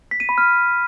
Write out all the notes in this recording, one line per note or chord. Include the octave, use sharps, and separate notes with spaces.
B6
D#7
B5
F6